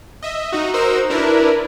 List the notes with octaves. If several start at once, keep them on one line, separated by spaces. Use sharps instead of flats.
D#5 E5
D#4 F#4
D#4 F#4 A#4 C5 E6
D4 E4 A#4 B4